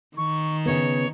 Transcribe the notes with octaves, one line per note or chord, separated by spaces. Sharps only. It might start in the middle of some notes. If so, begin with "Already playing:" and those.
D#3 C#6
C#3 B3 C#5